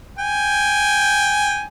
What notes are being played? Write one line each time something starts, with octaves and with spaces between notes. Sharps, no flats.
G5 G#5